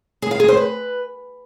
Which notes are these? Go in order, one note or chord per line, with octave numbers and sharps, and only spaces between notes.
G#4
F5
G#4
C5
B4